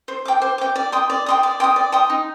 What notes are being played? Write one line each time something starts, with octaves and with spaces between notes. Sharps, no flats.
C5
G5 D6
C5
G5 D6
D5
G5 C6 D#6
D5
G5 C6 D#6
D5
G5 C6 D#6
D5
G5 C6 D#6
D#4